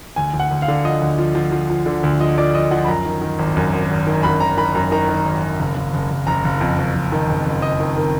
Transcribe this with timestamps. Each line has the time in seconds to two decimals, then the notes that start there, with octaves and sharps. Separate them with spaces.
0.16 D2 G#5
0.34 D2
0.40 F#5
0.51 D2
0.62 F5
0.68 D3
0.85 F3 D#5
1.01 D2
1.18 F3
1.35 F3
1.52 F3
1.70 F3
1.86 D3
2.03 D2
2.20 F3 D#5
2.38 F3 D5
2.54 F3 D#5
2.71 F3 F#5
2.84 B5
2.88 F#2 A#5
3.05 D#3
3.21 D#3
3.39 G#1
3.57 F#2
3.73 G#1
3.91 G#1
4.07 D#3
4.23 F#2 B5
4.40 G#1 A#5
4.58 D#3 B5
4.75 F#2 A#5
4.92 D#3 A#5
5.09 D#3
5.25 G#1
5.43 G#1
5.59 F#1
5.76 F#1
5.94 F#1
6.10 F#1
6.27 F#1 A#5
6.45 F#1
6.61 F2
6.78 F#1
6.95 F#1
7.12 D#3
7.29 F#1
7.46 F#1
7.62 F#1 D#5
7.80 D#3
7.97 D#3